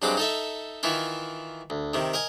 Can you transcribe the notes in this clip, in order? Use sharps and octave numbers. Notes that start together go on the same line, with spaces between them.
G2 F#3 G#3 C4 D6
D#4 A4 E5
D#3 E3 E4 F4
D2
C3 D#3
A#4 D#5 G#5